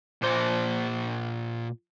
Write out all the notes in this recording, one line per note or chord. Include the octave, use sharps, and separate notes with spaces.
A#2 C5